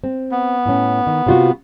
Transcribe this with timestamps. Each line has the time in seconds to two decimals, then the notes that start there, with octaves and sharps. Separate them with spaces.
0.04 C4
0.32 B3
0.66 A2 C#4
1.07 D#3
1.26 C3 F4 F#4